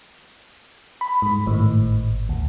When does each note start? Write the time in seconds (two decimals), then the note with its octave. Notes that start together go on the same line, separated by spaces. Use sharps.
1.01 B5
1.22 G#2
1.47 G#1 A2
2.29 D2